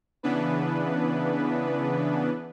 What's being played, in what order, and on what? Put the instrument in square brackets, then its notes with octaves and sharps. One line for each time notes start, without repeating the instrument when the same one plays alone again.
[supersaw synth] C#3 E3 B3 D4 B4